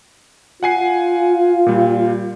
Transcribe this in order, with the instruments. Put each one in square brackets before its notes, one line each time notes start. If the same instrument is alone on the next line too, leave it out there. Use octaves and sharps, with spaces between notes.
[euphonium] F4 [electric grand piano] F#5 G#5 C7
[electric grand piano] A#2 G3